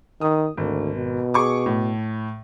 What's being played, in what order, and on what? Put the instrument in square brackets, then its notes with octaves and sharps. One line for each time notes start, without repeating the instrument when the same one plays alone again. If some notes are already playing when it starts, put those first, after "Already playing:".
[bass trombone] D#3 [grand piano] D#6
[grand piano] G#1 [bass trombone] D2
[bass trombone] B2
[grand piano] G#4 C#6 D6
A2